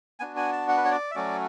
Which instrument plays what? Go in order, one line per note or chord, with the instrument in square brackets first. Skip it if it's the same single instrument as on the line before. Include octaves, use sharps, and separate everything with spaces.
[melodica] B3 D4 F#4 G#5
G#5
A5
F#5
B4
C#5
D5
E5
F#3 A3 C#4 F#4 D5